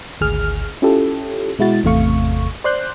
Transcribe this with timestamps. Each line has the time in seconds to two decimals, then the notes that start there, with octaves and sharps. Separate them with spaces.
0.21 G#1 D2 G#4 F6
0.82 C#4 E4 F4 G4 A4
1.59 B2 G#3 E4 F#4 A6
1.84 G#1 E2 C3 A3 F5 C#6
2.64 C5 D5 C6 F#6 G6